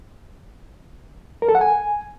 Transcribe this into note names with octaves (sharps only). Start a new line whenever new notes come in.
A#4
A4
F#5
G#5